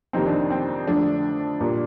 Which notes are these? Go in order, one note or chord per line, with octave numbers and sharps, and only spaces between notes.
F2 C3 D#3 A#3 C4 D#4
D4
C4
C4
F2 D3 F3 A3 D4
A#2 G3 A#3